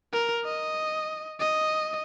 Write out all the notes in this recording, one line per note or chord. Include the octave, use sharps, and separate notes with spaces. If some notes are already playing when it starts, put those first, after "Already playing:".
A#4
D#5
D#5